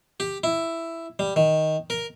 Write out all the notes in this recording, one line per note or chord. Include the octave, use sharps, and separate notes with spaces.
G4
E4
G3
D#3
A#4